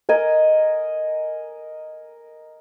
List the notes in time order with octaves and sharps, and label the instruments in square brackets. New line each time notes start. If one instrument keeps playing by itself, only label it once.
[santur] A#4 D#5 G#5